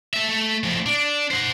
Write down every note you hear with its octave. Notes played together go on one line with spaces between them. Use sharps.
A4 E5
A3
A2 F3
D4
C5 F#5